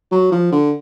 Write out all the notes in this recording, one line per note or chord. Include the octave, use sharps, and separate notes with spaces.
F#3
F3
D3